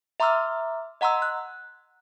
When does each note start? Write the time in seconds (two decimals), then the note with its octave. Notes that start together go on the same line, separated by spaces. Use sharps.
0.20 E5 A#5 C6 D6 E6 F6
1.01 D#5 F#5 A#5 C6 E6
1.22 F#6